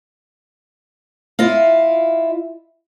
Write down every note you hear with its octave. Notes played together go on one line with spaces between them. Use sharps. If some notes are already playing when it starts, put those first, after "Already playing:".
E4 F4 D#5 F5